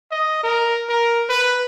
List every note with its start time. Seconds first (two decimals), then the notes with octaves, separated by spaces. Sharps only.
0.11 D#5
0.43 A#4
0.89 A#4
1.29 B4